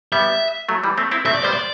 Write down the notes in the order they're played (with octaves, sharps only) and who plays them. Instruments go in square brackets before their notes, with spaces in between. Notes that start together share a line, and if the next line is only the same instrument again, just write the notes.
[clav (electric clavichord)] G3 B3 [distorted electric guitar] E5
[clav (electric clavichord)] F#3 A3
E3 G3
A3 C4
C4 E4
[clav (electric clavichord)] A3 C4 [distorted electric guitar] E5
[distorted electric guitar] D5
[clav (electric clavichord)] G3 B3 [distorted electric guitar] C5
[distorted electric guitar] D5